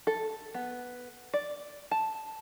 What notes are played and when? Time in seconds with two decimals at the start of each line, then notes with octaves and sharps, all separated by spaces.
0.07 A4
0.54 B3
1.34 D5
1.91 A5